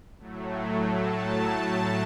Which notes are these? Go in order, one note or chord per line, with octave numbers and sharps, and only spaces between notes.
A2 F#3 A3
A5